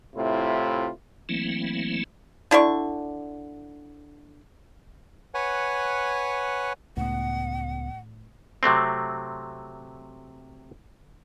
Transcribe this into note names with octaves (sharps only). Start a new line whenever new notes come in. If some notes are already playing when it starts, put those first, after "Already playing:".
A2 C3 E4 F4
E3 F#3 A3 A#3 C4 E4
D3 E4 D5 C#6
B4 C#5 F#5 G#5
C#2 A2 B3 F#5
C3 F#3 A3 C4